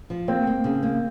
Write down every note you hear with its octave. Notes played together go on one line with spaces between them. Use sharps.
F3
A#3 C4
A#3
C#3
A#3